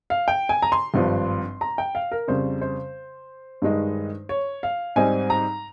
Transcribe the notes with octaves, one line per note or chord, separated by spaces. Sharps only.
F5
G5
G#5
A#5
C6
G#1 G2 F3
A#5
G5
F5
A#4
F2 C#3 G3 C5
C5
G2 D#3 G#3 D#4
C#5
F5
G#2 G3 C4 D#4 G#5
A#5